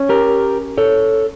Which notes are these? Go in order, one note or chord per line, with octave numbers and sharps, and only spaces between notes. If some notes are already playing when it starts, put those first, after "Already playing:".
Already playing: C#4
G4 A#4
A4 C#5